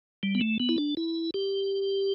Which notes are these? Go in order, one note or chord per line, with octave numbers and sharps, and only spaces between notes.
G3
B3
A3
B3
E4
D4
E4
G4